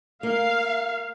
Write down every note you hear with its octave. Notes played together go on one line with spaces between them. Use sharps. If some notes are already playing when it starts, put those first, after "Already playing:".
A#3 F5